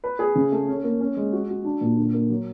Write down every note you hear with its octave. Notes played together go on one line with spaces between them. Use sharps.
B4
G#4
C#3
A3
C#4
A#3
C#4
G#3
F#4
F#4
D4
A#2
D3
A#3
F#3